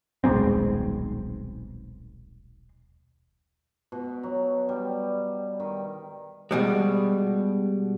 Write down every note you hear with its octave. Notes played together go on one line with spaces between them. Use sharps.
D#1 B1 G#3 C4
B2
F#3
G3
D#3
B2 G3 G#3